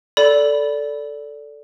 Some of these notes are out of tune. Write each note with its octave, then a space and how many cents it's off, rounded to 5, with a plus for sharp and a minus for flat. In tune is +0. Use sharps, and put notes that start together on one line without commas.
A4 +0 D5 -15 B5 +0